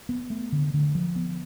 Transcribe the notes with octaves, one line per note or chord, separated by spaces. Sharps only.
B3
A3
D3
D3
F3
B3